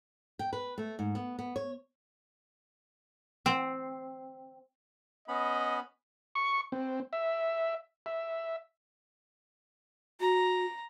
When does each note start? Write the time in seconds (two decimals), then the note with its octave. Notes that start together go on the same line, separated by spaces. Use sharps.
0.39 G5
0.53 B4
0.78 A3
0.99 G#2
1.15 B3
1.39 B3
1.56 C#5
3.46 C4
5.28 B3 C#4 D#5 B5
6.35 C#6
6.72 C4
7.13 E5
8.06 E5
10.21 F#4 A#5